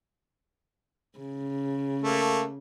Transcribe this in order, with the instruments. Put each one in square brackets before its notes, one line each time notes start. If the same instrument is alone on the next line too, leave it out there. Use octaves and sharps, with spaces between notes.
[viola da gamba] C#3
[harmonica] A3 A#3